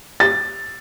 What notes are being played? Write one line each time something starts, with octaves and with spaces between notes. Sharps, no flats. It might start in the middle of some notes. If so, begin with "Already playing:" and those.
A6